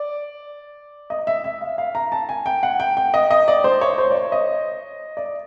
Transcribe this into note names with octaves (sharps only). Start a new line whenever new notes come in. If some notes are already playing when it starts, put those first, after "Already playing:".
Already playing: D5
D#5
E5
E5
F5
F5
A#5
A5
G#5
G5
F#5
G5
G5
D#5
D#5
D5
C5
C#5
C5
D5
C#5
D#5
D5